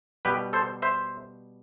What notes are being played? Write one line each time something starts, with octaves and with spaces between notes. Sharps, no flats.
B2 G3 G4 B4
A4 C5
C5 E5